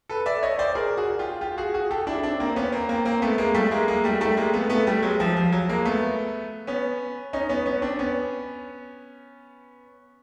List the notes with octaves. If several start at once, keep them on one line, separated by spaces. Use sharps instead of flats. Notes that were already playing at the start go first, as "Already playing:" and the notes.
A4 B4
D5 E5
C#5 D#5
C5 D5
G#4 A#4
F#4 G#4
F4 G4
F4 G4
F#4 G#4
F#4 G#4
G4 A4
D4 E4
C4 D4
A#3 C4
B3 C#4
A#3 C4
A#3 C4
A#3 C4
A3 B3
G#3 A#3
G3 A3
G#3 A#3
G#3 A#3
G3 A3
G3 A3
G#3 A#3
A3 B3
A3 B3
G3 A3
F#3 G#3
F3 G3
F3
F#3
G#3 A#3
A3 B3
B3 C#4
C#4 D#4
B3 C#4
B3 C#4
C4 D4
B3 C#4